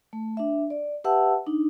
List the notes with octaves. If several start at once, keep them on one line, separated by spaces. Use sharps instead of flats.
A3
D4 E5
D5
G4 B4 E5 F#5 A5 E6
D4 D#4